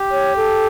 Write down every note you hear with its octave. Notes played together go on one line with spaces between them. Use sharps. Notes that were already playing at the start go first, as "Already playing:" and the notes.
Already playing: G4
C#5
A4